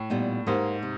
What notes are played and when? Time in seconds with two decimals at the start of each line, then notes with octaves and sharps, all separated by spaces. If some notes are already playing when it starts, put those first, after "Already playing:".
Already playing: A2
0.10 A#2 G3 B3 D#4
0.47 G#2 A#3 D#4 G4 C5
0.83 C3